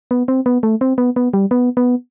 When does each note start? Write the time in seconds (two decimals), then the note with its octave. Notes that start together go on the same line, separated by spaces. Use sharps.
0.11 B3
0.28 C4
0.46 B3
0.63 A3
0.81 C4
0.98 B3
1.16 B3
1.34 G3
1.51 B3
1.77 B3